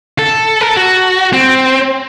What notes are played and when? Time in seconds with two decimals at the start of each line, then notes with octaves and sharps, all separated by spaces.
0.19 A4
0.61 A#4
0.69 A4
0.76 F#4
1.33 C4